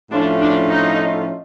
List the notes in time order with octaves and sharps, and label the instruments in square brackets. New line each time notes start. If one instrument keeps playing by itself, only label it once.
[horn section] A2 F3 A3 C#4 F4 [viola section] D4
[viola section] D4
D#4